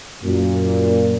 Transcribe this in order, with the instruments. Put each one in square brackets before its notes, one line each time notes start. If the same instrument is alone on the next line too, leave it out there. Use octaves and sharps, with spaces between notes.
[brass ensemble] F#2 A#2